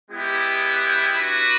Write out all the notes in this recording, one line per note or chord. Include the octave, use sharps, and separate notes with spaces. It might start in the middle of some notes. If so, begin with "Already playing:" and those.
G#3 B3 E4 G4
D4 F#4 B4